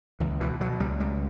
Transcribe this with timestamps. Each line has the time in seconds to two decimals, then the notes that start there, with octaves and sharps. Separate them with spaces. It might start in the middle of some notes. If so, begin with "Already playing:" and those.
0.20 C#2 E3
0.40 B2 E3
0.60 B2 F#3
0.80 C#2 G3
1.00 C#2 G3